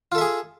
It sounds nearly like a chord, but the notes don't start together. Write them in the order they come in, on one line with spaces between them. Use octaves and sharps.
F4 A4 E5 G#4